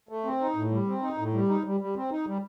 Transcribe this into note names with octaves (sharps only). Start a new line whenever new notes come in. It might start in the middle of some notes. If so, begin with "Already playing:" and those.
A3
C4
D#4
A2
G3
C4
D#4
A2
G3
D#4
G3
G3
C4
D#4
G3